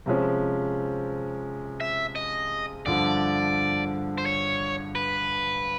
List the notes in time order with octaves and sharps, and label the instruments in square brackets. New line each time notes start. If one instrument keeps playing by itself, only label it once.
[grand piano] C3 F3 G#3 C#4
[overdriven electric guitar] E5
D#5
[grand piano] G2 D3 F3 [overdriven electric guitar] D5
[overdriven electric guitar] C5
C#5
B4